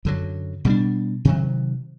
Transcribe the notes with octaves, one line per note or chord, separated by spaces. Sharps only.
F#2 D3 F#3
B2 G3 B3 D4
C3 D#3 F#3